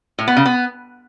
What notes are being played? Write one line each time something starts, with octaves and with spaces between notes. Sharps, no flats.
A2
B3
C#3
B3